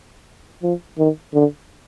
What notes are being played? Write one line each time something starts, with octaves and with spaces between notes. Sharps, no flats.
F3
D#3
D3